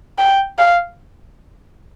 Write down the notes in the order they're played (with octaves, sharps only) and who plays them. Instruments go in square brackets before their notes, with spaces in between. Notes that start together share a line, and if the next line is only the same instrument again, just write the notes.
[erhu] G5
F5